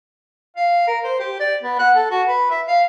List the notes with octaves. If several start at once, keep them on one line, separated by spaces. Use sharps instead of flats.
F5
A#4
C5
G4
D5
B3
F#5
A4
F#4
B4
E5
F5